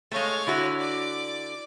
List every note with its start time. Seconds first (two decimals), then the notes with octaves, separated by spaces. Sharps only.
0.12 G#3 A3 C#5 F5
0.47 D3 E4 F#4
0.78 D5 D6